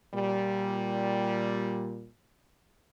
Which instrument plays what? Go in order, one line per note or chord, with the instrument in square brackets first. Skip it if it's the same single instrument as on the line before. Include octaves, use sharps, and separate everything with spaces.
[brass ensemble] A#2 G3